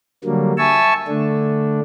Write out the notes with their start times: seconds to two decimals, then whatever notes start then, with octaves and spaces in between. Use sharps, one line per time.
0.24 D3 F#3 G3 A#3
0.58 E5 G#5 A5 C#6 E6
1.08 D3 A3 D4